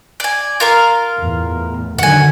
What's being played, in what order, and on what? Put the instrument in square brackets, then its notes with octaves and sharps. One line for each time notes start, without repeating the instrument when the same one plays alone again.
[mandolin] D5 G#5
F4 A#4 F5
[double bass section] E2 A2
[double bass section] D3 D#3 F#3 [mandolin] F#5 G#5